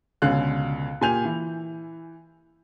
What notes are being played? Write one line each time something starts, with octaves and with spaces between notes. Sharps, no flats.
C#2 B2 D3 C#4 F5 F#6
A#2 G4 G#5 G6 F7
E3